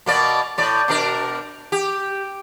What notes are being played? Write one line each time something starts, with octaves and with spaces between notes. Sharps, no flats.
B2 A#3 D5
A2 D5
B2 D4 A#4
G4